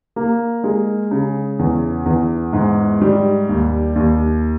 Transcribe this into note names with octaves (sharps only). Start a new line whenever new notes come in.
A#3
G#3
C#3
E2
E2
G#2
G3
D#2
D#2